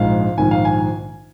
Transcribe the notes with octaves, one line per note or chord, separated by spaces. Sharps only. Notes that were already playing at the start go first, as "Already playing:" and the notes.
Already playing: A#1 G#2 G#3 F5
A#1 G#2 D#3 G#5
F5
G#5